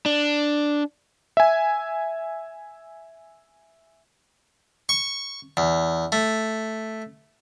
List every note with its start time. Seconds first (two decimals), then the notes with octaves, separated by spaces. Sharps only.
0.06 D4
1.37 E5 G#5
4.89 C#6
5.57 E2
6.12 A3